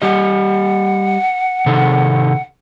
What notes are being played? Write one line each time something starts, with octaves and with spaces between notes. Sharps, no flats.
G3 G4 D#5 F#5
C3 D#3 A4